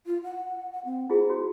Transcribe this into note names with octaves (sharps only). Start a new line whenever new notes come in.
F4
F#5
F#5
C4
E4 F4 G#4 C5
F#4